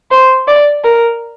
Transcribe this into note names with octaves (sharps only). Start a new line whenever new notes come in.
C5
D5
A#4